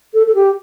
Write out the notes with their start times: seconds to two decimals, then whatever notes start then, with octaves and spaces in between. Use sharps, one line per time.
0.14 A4
0.27 A4
0.35 G4